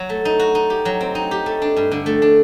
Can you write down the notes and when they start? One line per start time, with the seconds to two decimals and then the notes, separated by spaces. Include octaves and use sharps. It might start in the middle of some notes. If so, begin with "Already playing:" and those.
Already playing: F#3 F#4
0.09 A3
0.25 D#4
0.40 F#4
0.55 D#4
0.70 G4
0.85 F#3
1.01 C4
1.15 D#4
1.31 G4
1.46 A3
1.62 D4
1.76 G2
1.91 D3
2.06 A3
2.22 D4